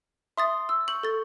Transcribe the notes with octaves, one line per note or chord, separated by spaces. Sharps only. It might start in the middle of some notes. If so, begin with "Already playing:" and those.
E5 C6 D#6 A6
E6
C#6 G6 F#7
A4 A6